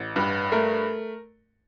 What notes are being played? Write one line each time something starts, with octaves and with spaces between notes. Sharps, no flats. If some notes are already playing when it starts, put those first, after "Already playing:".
Already playing: A1
G2
A3 A#4